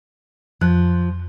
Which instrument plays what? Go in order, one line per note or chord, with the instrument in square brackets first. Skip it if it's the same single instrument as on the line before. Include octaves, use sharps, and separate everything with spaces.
[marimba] F2 F#6 [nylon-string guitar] F3